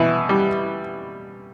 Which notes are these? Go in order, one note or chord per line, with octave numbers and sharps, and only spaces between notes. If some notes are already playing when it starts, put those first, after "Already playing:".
Already playing: B2 E3 E4
G3